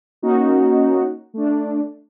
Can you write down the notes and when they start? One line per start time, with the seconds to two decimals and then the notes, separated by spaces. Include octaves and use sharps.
0.22 A#3 C#4 D#4 F#4
1.34 A3 D4